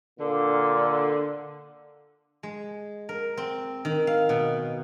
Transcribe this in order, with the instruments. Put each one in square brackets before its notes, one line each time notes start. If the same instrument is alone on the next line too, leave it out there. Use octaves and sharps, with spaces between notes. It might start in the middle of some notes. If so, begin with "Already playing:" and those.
[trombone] A#2 [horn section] D3
[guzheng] G#3
A#4
C4
D#3
F5
B2